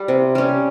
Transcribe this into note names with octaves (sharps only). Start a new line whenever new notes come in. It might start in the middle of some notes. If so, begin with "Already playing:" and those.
Already playing: G3
C3
G3 C#4